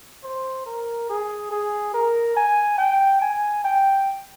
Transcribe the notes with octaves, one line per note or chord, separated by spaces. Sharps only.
C5
A#4
G#4
G#4
A#4
G#5
G5
G#5
G5